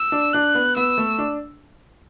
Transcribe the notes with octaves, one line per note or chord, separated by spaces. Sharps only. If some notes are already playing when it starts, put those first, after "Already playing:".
Already playing: E6
D4
D4 F#6
B3
B3 E6
A3
D4